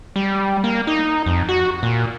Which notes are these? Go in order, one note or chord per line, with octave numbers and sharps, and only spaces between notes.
G3
A#3
D#4
F2
F#4
A#2